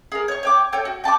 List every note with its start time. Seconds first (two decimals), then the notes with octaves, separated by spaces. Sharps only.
0.12 G#4 A#4
0.28 C#5 C#6
0.43 C#5 G5 D6
0.73 A4 C#5 G5
0.85 F#4
1.04 G5 A5 C6 D6